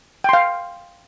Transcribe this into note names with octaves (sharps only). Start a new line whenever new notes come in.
F5 G5 C6